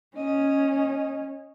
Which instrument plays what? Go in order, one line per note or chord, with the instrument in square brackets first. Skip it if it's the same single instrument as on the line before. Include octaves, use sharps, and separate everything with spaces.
[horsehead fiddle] C#4 [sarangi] D#5